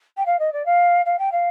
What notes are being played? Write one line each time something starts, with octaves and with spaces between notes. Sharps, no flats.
G5
F5
D#5
D5
F5
F5
G5
F5